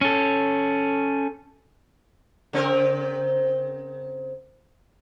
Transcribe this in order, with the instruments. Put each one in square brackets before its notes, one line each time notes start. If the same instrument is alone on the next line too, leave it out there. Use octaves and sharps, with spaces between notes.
[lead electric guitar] C#4 A4
[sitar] C#3 C4 A#4